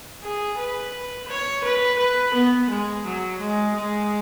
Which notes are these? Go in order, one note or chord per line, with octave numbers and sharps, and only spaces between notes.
G#4
B4
C#5
B4
B4
B3
G#3
F#3
G#3
G#3